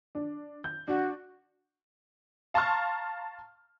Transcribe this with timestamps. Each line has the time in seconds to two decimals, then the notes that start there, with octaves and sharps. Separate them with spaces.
0.15 D4
0.64 G6
0.88 D4 F#4
2.54 F5 A5 A#5 C6 C#6 F6